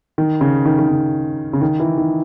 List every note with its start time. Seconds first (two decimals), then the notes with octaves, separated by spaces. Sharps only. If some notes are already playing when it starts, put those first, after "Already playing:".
0.18 D#3
0.41 C#3
0.66 D#3
0.79 D#3
0.89 C#3
1.53 C#3
1.61 D#3
1.80 E3
1.98 D#3